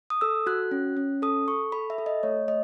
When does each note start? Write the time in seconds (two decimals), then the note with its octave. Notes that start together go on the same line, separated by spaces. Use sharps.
0.10 D#6
0.21 A4 E6
0.46 F#4 F#6
0.71 C#4
0.97 C#4
1.22 A4 D#6
1.48 A4 C#6
1.72 A4 B5
1.90 E5
1.98 A4
2.06 D#5
2.23 A3 C#5
2.48 A3 D#5